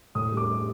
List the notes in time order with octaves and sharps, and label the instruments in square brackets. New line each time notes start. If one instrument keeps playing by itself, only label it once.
[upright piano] A2 D#6
G3
D6